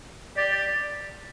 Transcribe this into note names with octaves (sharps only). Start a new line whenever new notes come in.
G4 D5
D5